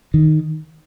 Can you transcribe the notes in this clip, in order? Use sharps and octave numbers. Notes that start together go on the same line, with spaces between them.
D#3